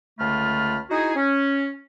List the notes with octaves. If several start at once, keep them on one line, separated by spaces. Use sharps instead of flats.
C#2 D3 A3 F4 B5 F6
D#4 E4 F#4 G#4
C#4